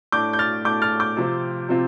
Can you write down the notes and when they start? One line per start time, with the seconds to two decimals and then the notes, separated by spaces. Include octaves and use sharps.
0.12 A2 A3 D4 D6 G6
0.33 G6
0.39 F6 A6
0.65 A2 A3 D4 D6 G6
0.82 F6 A6
1.00 D6 G6
1.17 C3 F3 C4 F4
1.69 C3 F3 C4 F4